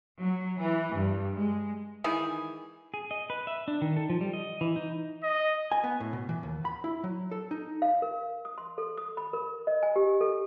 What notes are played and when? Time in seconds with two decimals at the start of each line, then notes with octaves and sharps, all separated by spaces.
0.21 F#3
0.61 E3
0.96 G2
1.38 G#3
2.04 D#3 E3 G#4
2.94 G#4
3.11 D#5
3.30 B4
3.47 E5
3.68 D4
3.82 D#3
3.97 A4
4.10 F3
4.21 G3
4.33 D#5
4.61 E3
4.76 D#4
5.23 D#5
5.72 G#5
5.84 B3
6.00 A2
6.13 B2
6.29 E3
6.43 D#2
6.65 B5
6.84 E4
7.04 F#3
7.31 A4
7.51 D#4
7.82 F5
8.02 A#4
8.45 D#6
8.58 C6
8.78 A4
8.97 D#6
9.17 B5
9.33 A#4
9.67 D#5
9.83 G#5
9.96 G4
10.21 A4